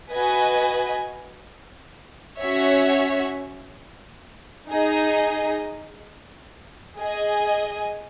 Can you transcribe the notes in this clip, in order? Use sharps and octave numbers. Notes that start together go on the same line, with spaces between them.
F#4 B4 D#5 G#5
C#4 F#4 C#5 E5
D#4 G#4 D#5
G#4 D#5 G#5